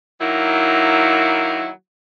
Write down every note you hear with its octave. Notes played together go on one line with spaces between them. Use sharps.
D#3 F#3 A#3 E4